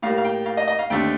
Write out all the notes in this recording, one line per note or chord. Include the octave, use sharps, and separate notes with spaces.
A2 G3 A#3 F5
F5
G5
F5
D#5
D#5
F5
D#2 D3 A3 C4 G5